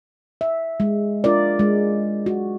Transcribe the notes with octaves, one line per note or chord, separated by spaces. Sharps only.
E5
G#3
D4 F4 A#4 D5
G#3
F#4